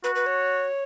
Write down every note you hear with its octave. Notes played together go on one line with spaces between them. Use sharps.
F#4 B4
B4
C#5